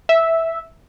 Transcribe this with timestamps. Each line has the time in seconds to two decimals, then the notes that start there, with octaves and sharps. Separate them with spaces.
0.09 E5